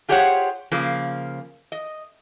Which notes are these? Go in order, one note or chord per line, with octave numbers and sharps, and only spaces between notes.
F4 G4 G#4 C5 C#5 F#5
C#3 F3 A#3
D#5